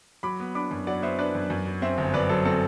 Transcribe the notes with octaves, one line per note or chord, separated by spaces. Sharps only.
F#3 B5 D6
B3
D4 B5 D6
F#2
F#3 D5 F#5
B3 C5 E5
D4 B4 D5
F#2
F#2
F#3
C4 C5 E5
G1
F#2 B4 D5
F#3 A4 C5
C4 A4